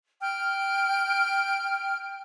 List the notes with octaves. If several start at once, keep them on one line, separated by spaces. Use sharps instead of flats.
G5 F6